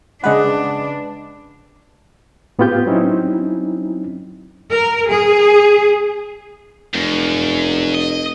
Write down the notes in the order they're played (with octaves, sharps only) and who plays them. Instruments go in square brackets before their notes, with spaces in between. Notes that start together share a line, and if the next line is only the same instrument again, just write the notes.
[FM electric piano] C#3 G#3 B4 [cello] D4 [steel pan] D#5 F#5
[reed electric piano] A2 B3 C4 F4 G4 G6
F#3 C4 C#4 D#4 E4
[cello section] A#4
G#4
[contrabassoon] F1 [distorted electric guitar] F#2
[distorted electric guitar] D#5